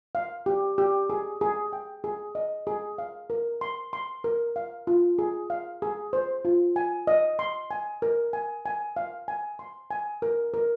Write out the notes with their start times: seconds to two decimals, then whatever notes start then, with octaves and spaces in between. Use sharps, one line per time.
0.15 F5
0.46 G4
0.78 G4
1.10 G#4
1.41 G#4
1.73 G5
2.04 G#4
2.35 D#5
2.67 G#4
2.98 F5
3.30 A#4
3.61 C6
3.93 C6
4.24 A#4
4.56 F5
4.87 F4
5.19 G#4
5.50 F5
5.82 G#4
6.13 C5
6.45 F4
6.76 G#5
7.07 D#5
7.39 C6
7.71 G#5
8.02 A#4
8.33 G#5
8.66 G#5
8.97 F5
9.28 G#5
9.59 C6
9.91 G#5
10.22 A#4
10.54 A#4